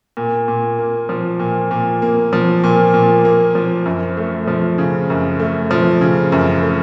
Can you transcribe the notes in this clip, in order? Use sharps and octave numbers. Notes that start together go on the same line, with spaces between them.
A#2
A#2
A#3
F3
A#2
A#2
A#3
F3
A#2
A#2
A#3
F3
F#2
A3
F3
C#3
F#2
A3
F3
C#3
F#2
A3